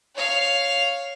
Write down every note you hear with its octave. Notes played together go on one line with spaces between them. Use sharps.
C#5 F5